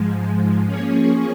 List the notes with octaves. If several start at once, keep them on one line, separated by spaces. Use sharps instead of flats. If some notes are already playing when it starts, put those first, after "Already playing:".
Already playing: G#2 F3 G#3
F3 A#3 C#4 G#4 C#5